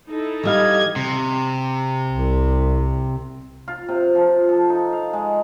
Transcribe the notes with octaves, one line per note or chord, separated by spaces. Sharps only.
D#4 E4 A4
E3 G3 D#5 F5 G#6
C3
C2
F4
C3
F3
A4
D#4
F5
G#3